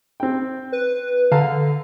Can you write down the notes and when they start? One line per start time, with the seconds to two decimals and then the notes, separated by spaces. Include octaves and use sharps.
0.20 C4 G5
0.72 B4
1.32 D3 F5 A5 A#5